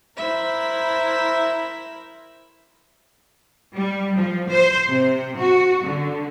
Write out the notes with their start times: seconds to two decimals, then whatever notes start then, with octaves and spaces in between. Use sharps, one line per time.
0.17 E4 A#4 C5 E5 B5
3.74 G3
4.15 F3
4.49 C5
4.87 C3
5.38 F#4
5.82 D3